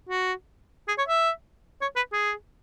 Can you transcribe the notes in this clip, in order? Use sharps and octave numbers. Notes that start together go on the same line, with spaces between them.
F#4
G#4
C#5
E5
C#5
B4
G#4